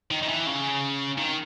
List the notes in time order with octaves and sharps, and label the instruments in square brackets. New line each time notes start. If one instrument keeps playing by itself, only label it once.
[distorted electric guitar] D#3
D#3
E3
C#3
D#3